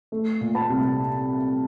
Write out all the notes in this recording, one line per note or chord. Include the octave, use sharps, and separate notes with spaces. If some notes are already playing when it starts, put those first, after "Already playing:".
A3
A#2
A5 B5
C2